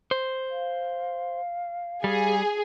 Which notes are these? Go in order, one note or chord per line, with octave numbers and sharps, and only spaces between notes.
C5
F5
G3 G#4